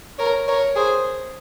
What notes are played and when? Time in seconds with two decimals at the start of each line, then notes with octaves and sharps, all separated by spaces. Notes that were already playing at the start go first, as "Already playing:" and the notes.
0.18 A#4 C#5
0.47 A#4 C#5
0.75 G#4 C5